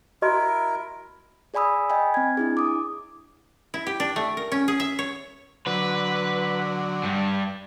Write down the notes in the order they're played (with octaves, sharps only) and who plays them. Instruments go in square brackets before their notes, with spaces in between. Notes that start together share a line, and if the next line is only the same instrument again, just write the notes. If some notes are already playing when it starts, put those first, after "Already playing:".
[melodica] E4 A#4 [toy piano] F#4 D#5 C6
[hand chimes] G#4 D5 G#5 B5 D#6 E6
D#5 G5 G#5 B5
C4 G#6
D4 E4 G#4
D6 D#6
[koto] E4
G4
D4
A3
A#4
C#4
G#4
E5
C#5
[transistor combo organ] D3 F#3 [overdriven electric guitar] B4
[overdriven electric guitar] G2